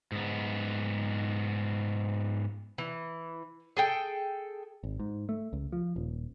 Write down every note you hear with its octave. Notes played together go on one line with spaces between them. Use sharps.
G#2 B3
E3
G#4 A4 G5
G#1
G#2
A3
C#2
F3
D#1